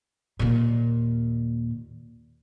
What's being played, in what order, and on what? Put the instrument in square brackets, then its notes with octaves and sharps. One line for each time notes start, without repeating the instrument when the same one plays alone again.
[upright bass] D#2 A#2